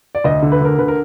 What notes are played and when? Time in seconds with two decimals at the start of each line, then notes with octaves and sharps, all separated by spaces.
0.15 D5
0.24 D2 D#5
0.42 D3
0.52 B4
0.61 D2 A#4
0.78 D3 B4
0.88 A#4